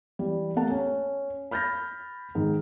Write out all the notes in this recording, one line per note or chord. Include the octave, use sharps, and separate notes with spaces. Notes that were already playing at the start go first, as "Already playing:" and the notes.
E3 G3
A3 A#3 F#5 A5
C#4
B5 F6 G6 A6 A#6
G#2 D#3